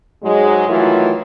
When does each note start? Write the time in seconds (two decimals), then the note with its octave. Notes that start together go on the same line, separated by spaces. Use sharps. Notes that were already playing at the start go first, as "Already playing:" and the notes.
0.24 G#2 F#3 G#3
0.68 D#3 E3 F#3 A3 E4 F4